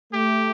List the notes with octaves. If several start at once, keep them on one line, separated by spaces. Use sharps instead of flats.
A3 G4